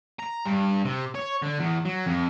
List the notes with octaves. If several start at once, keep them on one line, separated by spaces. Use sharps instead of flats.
A#5
G2
C3
C#5
D3
E2
F#3
F2